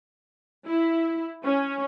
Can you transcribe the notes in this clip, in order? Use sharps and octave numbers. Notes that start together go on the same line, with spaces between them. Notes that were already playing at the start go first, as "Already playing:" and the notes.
E4
C#4